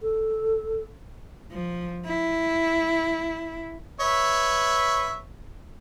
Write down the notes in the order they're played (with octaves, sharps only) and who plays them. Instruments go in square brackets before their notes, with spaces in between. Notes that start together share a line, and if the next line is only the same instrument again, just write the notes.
[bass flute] A4
[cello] F3
E4
[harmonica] B4 C#5 E5